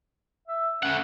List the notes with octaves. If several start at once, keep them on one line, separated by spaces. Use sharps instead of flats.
E5
A3 C#4 F#5